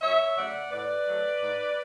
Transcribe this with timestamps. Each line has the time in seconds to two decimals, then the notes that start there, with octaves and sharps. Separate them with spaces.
0.01 F#2 C#5 E5
0.36 C#3 F#3 A3 D5 F#5
0.72 A2 B4 D5
1.05 F#3 A3
1.40 G#2